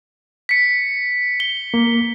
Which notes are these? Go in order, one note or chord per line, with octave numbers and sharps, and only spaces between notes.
B6 C#7
G7
A#3